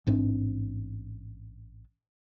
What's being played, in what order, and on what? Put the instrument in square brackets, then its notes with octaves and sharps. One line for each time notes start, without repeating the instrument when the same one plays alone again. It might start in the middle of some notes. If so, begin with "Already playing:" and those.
[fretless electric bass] A1 G#2 C4 D4